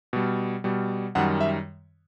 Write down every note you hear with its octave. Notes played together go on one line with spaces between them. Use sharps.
B2 G3
B2 G3
F#2 D#3 G3 F#5
E5